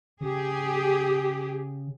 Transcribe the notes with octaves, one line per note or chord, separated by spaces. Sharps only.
C#3 G4 G#4